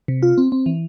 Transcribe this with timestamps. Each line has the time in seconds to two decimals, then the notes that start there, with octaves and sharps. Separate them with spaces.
0.08 C3
0.23 F4
0.38 C4
0.52 C4
0.66 E3